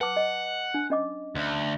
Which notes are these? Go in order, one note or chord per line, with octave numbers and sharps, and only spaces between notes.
B4 F#5 A5 D6
D#5
D4
C#4 D#5 D6
D2